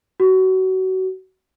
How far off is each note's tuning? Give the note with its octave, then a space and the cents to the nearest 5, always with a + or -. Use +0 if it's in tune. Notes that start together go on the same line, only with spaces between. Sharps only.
F#4 +25